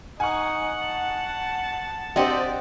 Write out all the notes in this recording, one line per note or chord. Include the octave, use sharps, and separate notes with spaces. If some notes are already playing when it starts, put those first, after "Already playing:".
D#4 F#5 G#5 C#6
A5
C4 D4 G4 C5 D5 D#5 F#5